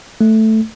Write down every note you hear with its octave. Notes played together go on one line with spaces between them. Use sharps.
A3